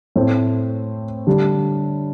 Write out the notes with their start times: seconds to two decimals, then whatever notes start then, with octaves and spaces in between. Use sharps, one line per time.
0.16 A2 A3 C4
1.27 D3 G3 D4